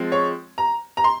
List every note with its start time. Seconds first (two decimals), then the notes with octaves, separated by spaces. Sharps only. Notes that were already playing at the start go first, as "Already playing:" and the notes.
Already playing: F3 G#3 C4
0.12 C#5
0.58 A#5
0.97 A#5
1.04 C6